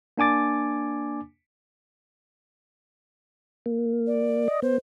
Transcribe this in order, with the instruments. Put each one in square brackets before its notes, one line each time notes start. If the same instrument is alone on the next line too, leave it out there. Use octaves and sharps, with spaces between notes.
[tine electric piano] A#3 D4 G#5 D6 A6
[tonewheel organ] A#3
[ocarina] D5
[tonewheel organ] D#5
[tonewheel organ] B3 [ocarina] C5